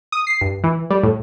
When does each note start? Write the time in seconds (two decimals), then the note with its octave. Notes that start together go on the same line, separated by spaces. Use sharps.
0.12 D#6
0.27 C7
0.41 G2
0.64 E3
0.90 G3
1.03 A2